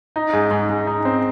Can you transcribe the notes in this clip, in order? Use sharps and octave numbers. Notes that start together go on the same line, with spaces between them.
D#4
G#2
G#2
G#2
D#4
C4